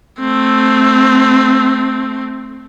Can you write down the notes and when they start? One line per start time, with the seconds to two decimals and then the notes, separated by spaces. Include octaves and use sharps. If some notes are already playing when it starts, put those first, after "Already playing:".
0.19 A3 C4